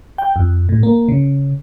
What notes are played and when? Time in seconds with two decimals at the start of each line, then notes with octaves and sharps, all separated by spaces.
0.18 G5
0.36 F2
0.69 A2
0.83 A#3
1.08 C#3